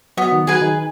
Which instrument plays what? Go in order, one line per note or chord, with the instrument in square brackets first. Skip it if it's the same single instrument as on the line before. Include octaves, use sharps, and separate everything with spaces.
[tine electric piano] F#3 F#4 [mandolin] B3
[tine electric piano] D#3 D#4
[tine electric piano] F#3 F#4 [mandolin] G#4 B4 G#5
[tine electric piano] D#3 D#4